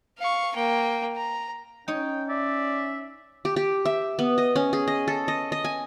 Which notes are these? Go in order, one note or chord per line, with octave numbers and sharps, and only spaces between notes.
F5 C#6
A#3 G5
A#5
C#4 D#4 C#5 G5
D5 E5
G4
G4
E5
B3
D#5
C#4
G#4
D#5
A4
D#5
D#5
G#5